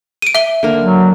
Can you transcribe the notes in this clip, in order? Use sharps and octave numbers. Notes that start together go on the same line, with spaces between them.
D7 D#7
E5 G7
D3 A#3
F#3